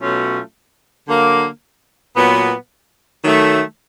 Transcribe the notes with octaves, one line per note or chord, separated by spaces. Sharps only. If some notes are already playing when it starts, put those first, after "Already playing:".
B2 F#3 A3 C#4 F4
D3 F#3 A#3
A#2 F#3 B3
D#3 F#3 A3